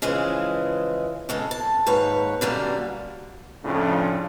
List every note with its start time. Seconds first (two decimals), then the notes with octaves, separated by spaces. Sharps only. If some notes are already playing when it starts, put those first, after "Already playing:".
0.02 C#3 E3 F3 G#3
1.29 C#3 G#3 A4
1.51 A5
1.86 D#2 G#2 B4 C#5
2.41 F#2 D3 G3 A#3
3.65 F2 A2 C#3 F3 C#4 D4